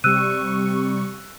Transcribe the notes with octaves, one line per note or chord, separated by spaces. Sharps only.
C3 G3 C#6 E6 F#6 D#7